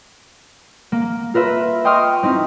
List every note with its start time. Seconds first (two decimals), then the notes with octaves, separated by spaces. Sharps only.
0.92 A#3
1.34 F4 A#4 B4 E5
1.85 D#5 G5 C6 C#6 D#6 F6
2.23 C4 D#4 E4